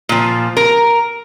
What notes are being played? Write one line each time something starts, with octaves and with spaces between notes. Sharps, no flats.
A#2 F3
A#4